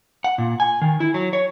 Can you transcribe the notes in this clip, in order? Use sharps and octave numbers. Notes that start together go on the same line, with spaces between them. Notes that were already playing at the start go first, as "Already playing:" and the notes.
F#5
A#2
G#5
D#3
E4
F#3
C#5